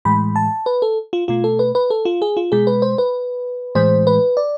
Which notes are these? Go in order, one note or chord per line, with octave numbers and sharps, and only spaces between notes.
A2 E3 G#3 B5
A5
B4
A4
F4
B2 A3 F4
A4
B4
B4
A4
F4
G#4
F4
B2 G#3 G#4
B4
C5
B4
A2 E3 G#3 C5
B4
D5